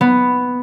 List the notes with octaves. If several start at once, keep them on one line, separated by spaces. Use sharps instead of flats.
B3